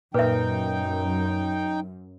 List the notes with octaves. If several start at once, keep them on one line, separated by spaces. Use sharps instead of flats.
F#2 A#2 D#4 B4 E5 G5